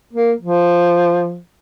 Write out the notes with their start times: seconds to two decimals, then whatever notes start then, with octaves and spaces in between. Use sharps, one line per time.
0.13 A#3
0.41 F3